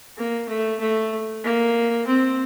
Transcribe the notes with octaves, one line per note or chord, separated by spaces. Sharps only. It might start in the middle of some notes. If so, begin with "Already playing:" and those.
A#3
A3
A3
A#3
C4